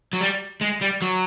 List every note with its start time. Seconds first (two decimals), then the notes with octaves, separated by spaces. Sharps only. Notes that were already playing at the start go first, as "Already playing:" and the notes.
0.13 F#3
0.21 G3
0.61 G#3
0.81 G3
1.02 F#3